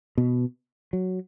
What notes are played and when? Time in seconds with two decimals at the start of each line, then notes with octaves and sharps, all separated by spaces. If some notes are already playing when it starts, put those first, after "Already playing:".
0.18 B2
0.93 F#3